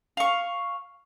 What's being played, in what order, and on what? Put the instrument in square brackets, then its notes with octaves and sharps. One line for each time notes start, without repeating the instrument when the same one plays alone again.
[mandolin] F5 C#6